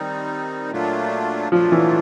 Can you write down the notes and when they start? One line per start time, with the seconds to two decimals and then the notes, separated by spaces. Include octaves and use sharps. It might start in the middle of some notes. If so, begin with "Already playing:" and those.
Already playing: D#3 G3 C4 D#4
0.71 A#2 F#3 A3 D4 F4
1.51 A#2 F3 F#3 A3 D4 F4
1.72 E3